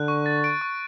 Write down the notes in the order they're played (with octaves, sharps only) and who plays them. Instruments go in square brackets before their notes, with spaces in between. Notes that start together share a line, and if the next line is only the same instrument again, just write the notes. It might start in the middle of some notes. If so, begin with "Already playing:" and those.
Already playing: [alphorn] D3 [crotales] F#6
[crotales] C#6
A6
D7
C#6